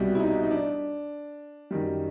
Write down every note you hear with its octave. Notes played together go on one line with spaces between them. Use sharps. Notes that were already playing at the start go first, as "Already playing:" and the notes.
Already playing: C2 B2 G3
E4
D#4
D#4
D4
F#2 D#3 G3